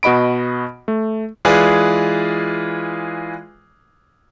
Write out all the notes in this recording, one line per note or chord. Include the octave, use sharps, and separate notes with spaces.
B2 F#4 D#5 B5 D7
A3
E3 G#3 F4 G#4 B4 D5